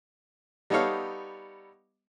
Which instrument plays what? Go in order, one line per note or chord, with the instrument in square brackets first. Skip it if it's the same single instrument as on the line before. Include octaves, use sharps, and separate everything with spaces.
[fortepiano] G3 B3 D#4 A4 C#5 F5